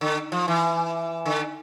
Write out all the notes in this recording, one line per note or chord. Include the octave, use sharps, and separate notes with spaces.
D3
F3
E3
D3